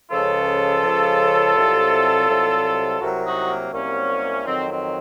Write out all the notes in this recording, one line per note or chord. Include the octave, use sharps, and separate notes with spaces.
C#2 C#3 F3 F4 A4
C#2 C#3 F3
C2 C3 F#3
C2 C3 F#3
C2 C3 F#3 F#4 A#4
D#4 F#4
A#3
C2 C3 F#3 A#3 C#4
F2 D#3 F#3 C4
C4